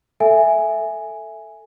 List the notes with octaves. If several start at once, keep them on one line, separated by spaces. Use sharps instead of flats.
A4 E5 G#5